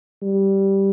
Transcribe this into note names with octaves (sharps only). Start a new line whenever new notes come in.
G3